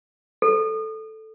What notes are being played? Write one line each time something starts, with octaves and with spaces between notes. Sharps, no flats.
A4